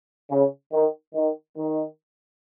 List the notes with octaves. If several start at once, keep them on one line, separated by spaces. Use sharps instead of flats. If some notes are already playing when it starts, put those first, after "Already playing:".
C#3
D#3
D#3
D#3